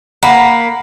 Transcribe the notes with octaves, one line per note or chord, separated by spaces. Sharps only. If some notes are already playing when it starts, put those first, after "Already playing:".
A#3 F#5 B5